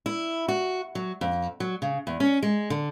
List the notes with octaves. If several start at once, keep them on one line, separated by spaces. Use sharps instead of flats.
E4
F#4
F#3
F2
F#3
C#3
E2
C#4
G#3
D3